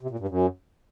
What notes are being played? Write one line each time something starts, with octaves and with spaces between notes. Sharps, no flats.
C3
A#2
G2
F#2